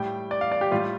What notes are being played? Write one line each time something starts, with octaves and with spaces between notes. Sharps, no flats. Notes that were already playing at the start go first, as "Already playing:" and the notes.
Already playing: A2 G3 G5
D5
F5
D5
G4
A2 G3 F4